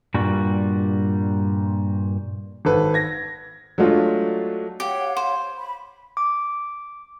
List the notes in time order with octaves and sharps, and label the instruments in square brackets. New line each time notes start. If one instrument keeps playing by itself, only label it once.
[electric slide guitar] G2 A#2 G3 F#4
[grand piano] G#1 A4 B4
G#6 A#6
F#3 G#3 A3 D4 F4
[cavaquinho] G4 [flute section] C#5 F5 F#5
[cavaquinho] C5
[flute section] B5
[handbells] D6